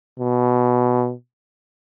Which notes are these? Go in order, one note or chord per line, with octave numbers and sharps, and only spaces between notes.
B2